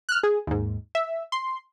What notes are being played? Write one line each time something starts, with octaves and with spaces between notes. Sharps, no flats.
F6 F#6
G#4
D#2 G#2
E5
C6